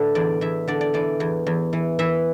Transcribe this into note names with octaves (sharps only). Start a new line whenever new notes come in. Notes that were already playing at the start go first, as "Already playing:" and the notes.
Already playing: A2 D3 A4 B4 E5
E2 D5
E2 E5
D3 D5
D5
E3 D5
E2
E2
E3
E3 E5